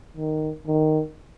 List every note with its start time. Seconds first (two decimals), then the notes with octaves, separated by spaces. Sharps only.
0.17 D#3
0.67 D#3